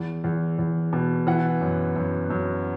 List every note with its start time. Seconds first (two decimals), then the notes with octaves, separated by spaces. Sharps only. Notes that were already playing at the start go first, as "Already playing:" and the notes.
Already playing: E2
0.24 E2
0.59 E2
0.93 B2
1.27 E3 F#5
1.61 F#2
1.96 F#2
2.30 F#2